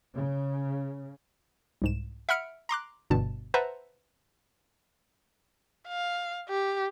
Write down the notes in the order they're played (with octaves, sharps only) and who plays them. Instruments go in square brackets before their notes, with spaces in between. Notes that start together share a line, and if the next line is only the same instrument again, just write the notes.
[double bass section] C#3
[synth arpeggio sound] C2 G#2 E7
E5 F#5 B5 F6 C#7 D7
A#5 C6 D6 F#6
G1 G2 B2 A5
B4 C5 E5 F#5 A5 A#5
[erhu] F5
G4